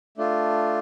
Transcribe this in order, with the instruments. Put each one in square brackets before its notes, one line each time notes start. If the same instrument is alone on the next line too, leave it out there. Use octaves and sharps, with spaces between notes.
[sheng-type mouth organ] A3 D4 F4